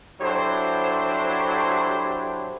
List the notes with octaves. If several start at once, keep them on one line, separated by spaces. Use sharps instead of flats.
F#3 D4 E4 G4 A4 C5